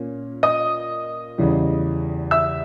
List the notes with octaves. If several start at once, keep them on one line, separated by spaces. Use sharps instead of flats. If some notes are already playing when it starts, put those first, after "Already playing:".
Already playing: A#2 A#3 C#4
D#5 D#6
E2 C#3 E3 G3
E5 E6